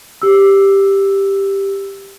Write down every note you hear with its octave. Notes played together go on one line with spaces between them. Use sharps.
G4 E6